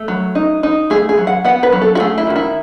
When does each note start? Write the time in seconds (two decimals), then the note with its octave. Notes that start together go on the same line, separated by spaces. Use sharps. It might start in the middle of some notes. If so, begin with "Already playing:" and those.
Already playing: A3
0.08 F#3
0.35 D#4
0.63 D#4
0.90 A3 G#4
1.09 G#4
1.18 F#3
1.27 F#5
1.45 B3 F#5
1.63 B4
1.72 F#3
1.82 A4
1.95 F#4
2.00 A3 G#4
2.18 E4
2.27 D#3 F#4
2.36 E4